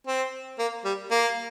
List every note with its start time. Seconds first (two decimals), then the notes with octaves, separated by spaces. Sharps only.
0.07 C4
0.59 A#3
0.85 G3
1.11 A#3